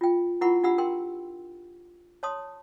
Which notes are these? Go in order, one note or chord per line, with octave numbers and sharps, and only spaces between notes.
F4 G5
E4 F4 A#4 F#5 B5 C#6
D4 F4 G4 F#5 B5 E6
A#4 G5 C6
C#5 A5 C6 D#6